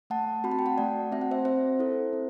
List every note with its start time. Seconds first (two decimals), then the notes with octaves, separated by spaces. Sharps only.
0.10 A3 F#5 A5
0.44 C4 F#4 B5
0.51 A5
0.59 G5
0.66 F#5 A5
0.77 A3 D5 F#5
1.12 C4 F#4 E5
1.21 F#5
1.31 C5 E5
1.45 C4 C5 E5
1.79 E4 A4
2.13 C4